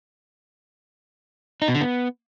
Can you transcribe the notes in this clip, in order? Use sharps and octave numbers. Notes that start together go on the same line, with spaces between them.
D#4
B2
D3
B3